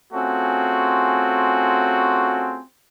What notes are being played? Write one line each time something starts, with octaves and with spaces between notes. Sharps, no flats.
A3 C4 C#4 F4 F#4 G#4